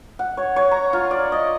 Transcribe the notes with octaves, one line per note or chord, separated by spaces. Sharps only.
F#5
C#5
C#5
A#5
F4
D5
D#5